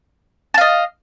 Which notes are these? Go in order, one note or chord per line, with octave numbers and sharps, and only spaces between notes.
D#5 F5 A5